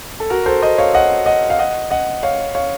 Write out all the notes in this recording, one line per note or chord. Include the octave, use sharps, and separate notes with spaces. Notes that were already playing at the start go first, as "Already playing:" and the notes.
A4
F#4 A#4
A4 C5
C5 D#5
C#5 F5
D#5 F#5
D#5 F#5
F5
D#5 F#5
D#5 F#5
C#5 F5
C#5 F5